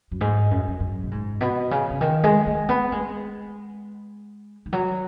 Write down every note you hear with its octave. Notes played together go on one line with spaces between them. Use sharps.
F#2
G#2
F#2
F#2
F#2
B2
G#2
B2
C#3
C#3
D#3
G#3
G#3
B3
G#3
D#3
F#3